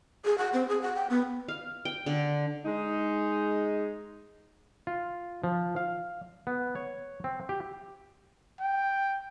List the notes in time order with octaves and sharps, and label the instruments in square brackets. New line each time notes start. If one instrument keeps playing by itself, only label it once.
[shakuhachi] G#4
F#5
C4
G#4
F#5
G5
B3
[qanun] F5
G5
D3
[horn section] G#3 D#4
[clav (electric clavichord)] F4
F3
F5
B3
C#5
C4
G4
[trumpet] G5